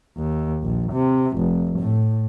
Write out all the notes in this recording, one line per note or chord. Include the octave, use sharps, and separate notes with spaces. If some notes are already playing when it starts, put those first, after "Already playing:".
D#2
A#1
C3
F1
A2